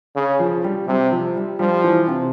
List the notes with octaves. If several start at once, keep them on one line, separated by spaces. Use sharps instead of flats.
C#3
F3
G3
C3 G3
F3
G3
F3 G3
E3
C3